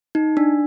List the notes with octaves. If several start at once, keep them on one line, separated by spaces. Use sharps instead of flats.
D#4
D4